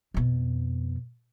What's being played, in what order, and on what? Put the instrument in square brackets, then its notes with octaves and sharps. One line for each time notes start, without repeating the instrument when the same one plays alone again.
[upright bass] F2 B2